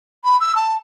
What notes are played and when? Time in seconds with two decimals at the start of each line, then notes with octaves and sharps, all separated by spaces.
0.24 B5
0.40 E6
0.55 A5